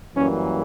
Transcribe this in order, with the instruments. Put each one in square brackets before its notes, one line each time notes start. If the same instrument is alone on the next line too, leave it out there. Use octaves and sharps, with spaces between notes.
[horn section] F#2 E3 G3 A#3 C#4